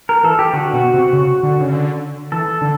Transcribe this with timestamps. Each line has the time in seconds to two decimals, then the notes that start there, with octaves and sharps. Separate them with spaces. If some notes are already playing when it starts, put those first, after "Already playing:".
0.09 A#4
0.23 E3 A4
0.39 G4
0.53 D3 F#4
0.73 B2
0.94 C3
1.13 C#3
1.43 D3
1.61 C#3
1.72 D3
2.32 E3 A4
2.62 D3